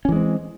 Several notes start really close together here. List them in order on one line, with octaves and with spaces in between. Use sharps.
C#4 E3 G#3 C4